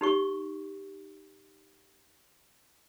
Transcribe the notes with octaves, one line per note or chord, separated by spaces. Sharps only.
D#4 G4 C#6